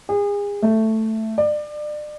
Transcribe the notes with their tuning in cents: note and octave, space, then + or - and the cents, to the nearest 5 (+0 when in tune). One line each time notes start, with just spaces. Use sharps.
G#4 -35
A3 +5
D5 +30